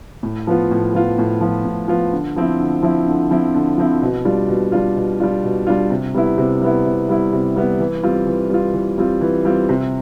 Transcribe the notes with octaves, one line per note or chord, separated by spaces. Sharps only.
A2
F3 B3 F4
A2
F3 B3 F4
A2
F3 B3 F4
A2
F3 B3 F4
D3
F3 C4 E4
D3
F3 C4 E4
D3
F3 C4 E4
D3
F3 C4 E4
B2
G3 D4 F4
B2
G3 D4 F4
B2
G3 D4 F4
B2
G3 D4 F4
C3
G3 B3 E4
C3
G3 B3 E4
C3
G3 B3 E4
C3
G3 B3 E4
E3
G3 C4 F4
E3
G3 C4 F4
E3
G3 C4 F4
E3
G3 C4 F4
C3